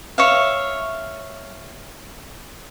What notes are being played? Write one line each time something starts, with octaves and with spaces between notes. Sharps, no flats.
C#5 E5 F5